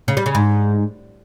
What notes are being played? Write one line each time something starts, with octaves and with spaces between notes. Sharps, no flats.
C#3
G3
C#3
G#2